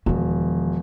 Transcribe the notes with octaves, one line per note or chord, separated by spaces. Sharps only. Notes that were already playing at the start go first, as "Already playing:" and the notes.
E1 D#3 F3